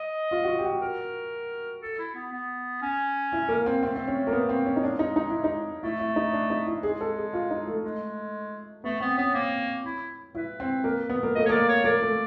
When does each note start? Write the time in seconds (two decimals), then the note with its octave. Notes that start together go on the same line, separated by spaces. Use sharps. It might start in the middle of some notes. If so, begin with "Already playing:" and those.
Already playing: D#5
0.31 F4
0.43 F#4
0.47 F4
0.59 G4
0.65 F#4
0.81 A#4
1.82 A4
1.99 E4
2.15 B3
2.32 B3
2.82 C#4
3.32 E4
3.49 A#3
3.66 C4
3.82 A3 C4
3.96 C4
4.08 C#4
4.27 A#3
4.33 B3
4.49 C4
4.66 C#4
4.76 D#4
4.83 G#3 D4
4.99 D#4
5.16 D#4
5.30 E4
5.44 D#4
5.83 A3 E4
5.99 E4
6.16 D#4
6.33 D4
6.50 D#4
6.67 E4
6.83 G#3 G#4
7.01 A4
7.17 G#4
7.33 F4
7.51 D#4
7.67 A3
7.84 G#3
8.84 A3 B3
9.00 B3 C4
9.18 B3 C#4
9.34 A#3 C4
9.84 E4
10.35 E4 B4
10.60 C4
10.84 A#3
11.10 B3
11.23 A#3
11.35 A3 D#5
11.46 C#5
11.49 A#3 D5
11.69 C#5
11.84 A#3 D5
12.02 A3